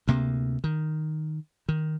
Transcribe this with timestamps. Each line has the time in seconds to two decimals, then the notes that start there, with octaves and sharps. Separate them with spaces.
0.08 D2 C3 A#3
0.64 D#3
1.69 D#3